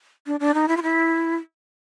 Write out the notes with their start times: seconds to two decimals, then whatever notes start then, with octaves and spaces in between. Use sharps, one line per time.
0.27 D4
0.40 D4
0.54 D#4
0.68 E4
0.77 F4
0.83 E4